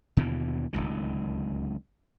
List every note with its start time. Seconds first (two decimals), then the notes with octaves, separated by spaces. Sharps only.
0.17 D#2 B2 D3 E3
0.73 D1 G1 C#2 D#3